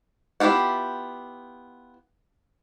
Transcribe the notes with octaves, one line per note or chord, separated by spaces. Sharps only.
B3 E4 F4 G4 F#5